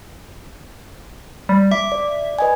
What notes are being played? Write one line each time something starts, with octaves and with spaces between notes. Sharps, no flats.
G3
E5 D6
D5
B4 D#5 G#5